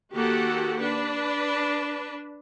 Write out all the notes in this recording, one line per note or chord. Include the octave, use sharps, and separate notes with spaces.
D#3 A#3 F#4 G4 A4 F#5
D4 B4